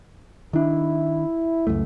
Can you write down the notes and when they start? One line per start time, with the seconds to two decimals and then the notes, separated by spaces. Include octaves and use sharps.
0.53 D#3 D4 E4
1.67 C#2 F#2 A3